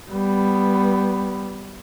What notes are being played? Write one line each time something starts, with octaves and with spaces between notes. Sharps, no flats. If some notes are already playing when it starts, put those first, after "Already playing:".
G3 B3